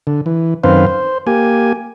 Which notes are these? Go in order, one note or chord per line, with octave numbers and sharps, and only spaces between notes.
D3
E3
F#2 D#3 C4 B4 C5 F5
C5
A#3 G4 G#5